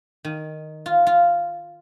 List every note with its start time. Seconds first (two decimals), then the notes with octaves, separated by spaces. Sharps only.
0.25 D#3
0.86 F4
1.07 F4